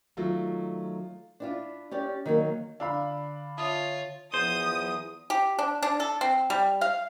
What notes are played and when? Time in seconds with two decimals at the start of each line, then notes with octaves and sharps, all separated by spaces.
0.17 D#3 F#3 A3 F4
1.40 D4 E4 F4
1.91 C#4 G4 D5
2.26 D#3 F#3 A#3
2.80 D3 D4 F5 B5 E6
3.57 F4 C#5 E5 A5 D#6
4.34 E2 F3 C5 D#6
5.30 G4
5.59 D4
5.83 D4
6.00 A4
6.21 C4
6.50 G3
6.81 F5